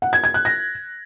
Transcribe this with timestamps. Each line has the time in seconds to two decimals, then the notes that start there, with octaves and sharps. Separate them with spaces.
0.02 F#5
0.13 G#6
0.24 G#6
0.34 F#6
0.45 A#6